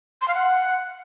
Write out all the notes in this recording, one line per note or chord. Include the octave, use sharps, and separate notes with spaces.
C6
F5
F#5